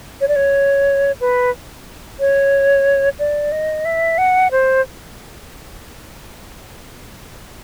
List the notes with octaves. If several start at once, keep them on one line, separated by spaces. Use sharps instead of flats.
C#5
D5
C#5
B4
C#5
D5
D#5
E5
F#5
C5